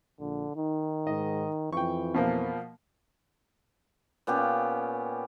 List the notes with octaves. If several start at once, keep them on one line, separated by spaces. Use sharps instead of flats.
A#1 D3
D#3 D#4
G#2 D#5
F2 E3 G5 C#6
B2 F3 A#3
A#2 B3 C#4 G4